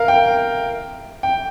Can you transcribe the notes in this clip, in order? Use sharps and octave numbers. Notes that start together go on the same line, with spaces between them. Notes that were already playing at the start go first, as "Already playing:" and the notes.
Already playing: A#4 F5
G5
G5